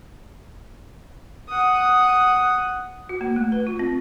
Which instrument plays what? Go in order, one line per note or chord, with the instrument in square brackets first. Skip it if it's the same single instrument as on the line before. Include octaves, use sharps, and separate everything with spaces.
[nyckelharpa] F#5 D#6
[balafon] F#4
A#3
A3
B4
F4
C4